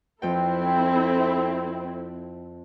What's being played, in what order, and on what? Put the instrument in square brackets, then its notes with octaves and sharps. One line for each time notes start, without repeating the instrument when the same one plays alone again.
[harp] F2 G5 [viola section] C4 E4 A4